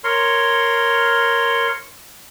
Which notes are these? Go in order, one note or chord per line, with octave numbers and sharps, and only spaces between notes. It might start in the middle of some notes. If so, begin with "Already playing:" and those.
A#4 C#5 C6